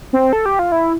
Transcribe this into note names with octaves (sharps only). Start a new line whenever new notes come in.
C4
A4
G4
F4
E4